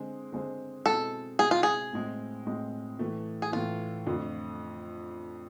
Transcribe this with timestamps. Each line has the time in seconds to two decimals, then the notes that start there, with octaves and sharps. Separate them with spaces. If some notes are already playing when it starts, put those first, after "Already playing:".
Already playing: D3 G#3 C4 G#4 C5
0.32 D3 G#3 C4 G#4 C5
0.86 B2 G#3 C4 E4 A4
1.39 B2 G#3 C4 E4 G#4
1.51 F4
1.63 G#4
1.93 A2 G#3 C4
2.46 A2 G#3 C4
2.99 A2 E3 A3
3.42 G#4
3.53 A2 E3 A3 F4
4.06 F2 D3 A3